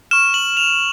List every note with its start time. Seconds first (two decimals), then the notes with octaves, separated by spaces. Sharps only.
0.11 C#6 F6 E7
0.34 F#7
0.57 F7